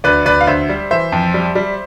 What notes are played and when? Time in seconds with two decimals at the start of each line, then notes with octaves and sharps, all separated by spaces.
0.04 D2 B4 D5
0.26 D2 B4 D5
0.41 F5
0.47 D2 C5 E5
0.69 G3
0.91 E3 C5 E5
1.12 F2
1.34 G3
1.55 G3